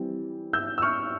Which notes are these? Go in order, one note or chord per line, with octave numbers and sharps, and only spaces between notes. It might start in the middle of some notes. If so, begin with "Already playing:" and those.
Already playing: E3 G3 C4
E6 G6
E6
C#6 F6